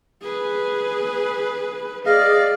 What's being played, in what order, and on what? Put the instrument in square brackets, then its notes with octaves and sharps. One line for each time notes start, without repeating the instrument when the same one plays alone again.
[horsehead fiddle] G#4 B4
[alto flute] G#4 [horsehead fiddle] D5 [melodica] D#5 F5